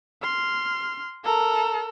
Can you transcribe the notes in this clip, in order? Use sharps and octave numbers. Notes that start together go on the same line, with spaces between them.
C6 F6
A4 A#4 A#5